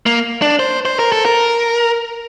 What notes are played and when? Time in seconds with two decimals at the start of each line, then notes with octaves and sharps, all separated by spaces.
0.06 A#3
0.42 D4
0.59 C5
0.85 C5
0.99 A#4
1.12 A4
1.25 A#4